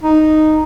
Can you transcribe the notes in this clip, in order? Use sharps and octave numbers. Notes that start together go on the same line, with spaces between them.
D#4